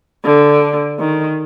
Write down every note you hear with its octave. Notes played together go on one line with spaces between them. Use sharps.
D3
D#3